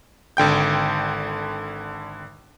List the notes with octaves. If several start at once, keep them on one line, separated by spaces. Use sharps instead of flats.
G#1 D3 G5 G6